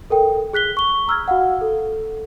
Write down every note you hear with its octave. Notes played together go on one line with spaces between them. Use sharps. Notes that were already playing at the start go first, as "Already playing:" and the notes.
A4 A#4 G5
G#4 F#6 B6 G7
C#6 G7
A#5 E6 F6 G#6
F#4 F5 F#5
A4